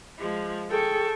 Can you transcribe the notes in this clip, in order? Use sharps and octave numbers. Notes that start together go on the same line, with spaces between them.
F3 G#3
G#4 A4 G5 C#6